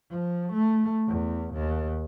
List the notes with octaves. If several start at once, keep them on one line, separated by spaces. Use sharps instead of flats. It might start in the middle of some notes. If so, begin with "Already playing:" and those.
F3
A3
E2
D#2